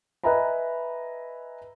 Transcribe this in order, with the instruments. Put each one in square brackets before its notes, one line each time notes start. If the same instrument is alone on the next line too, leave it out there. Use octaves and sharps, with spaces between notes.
[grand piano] B4 D#5 E5 G#5 A#5 B5